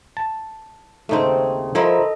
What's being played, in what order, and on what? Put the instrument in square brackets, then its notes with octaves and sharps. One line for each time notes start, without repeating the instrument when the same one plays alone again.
[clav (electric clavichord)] A5
[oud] D#2 C#3 C4 [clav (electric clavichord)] A3 D#4
[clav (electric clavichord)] F3 [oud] E4 A#4 C5 [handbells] A4 D#5